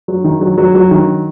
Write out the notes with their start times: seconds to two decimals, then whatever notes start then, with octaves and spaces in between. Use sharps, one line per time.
0.08 F#3
0.24 D#3
0.41 F#3
0.58 F#3
0.75 F#3
0.91 D#3